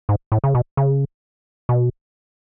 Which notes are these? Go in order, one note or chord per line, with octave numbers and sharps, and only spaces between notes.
G#2
A2
C#3
B2
C#3
B2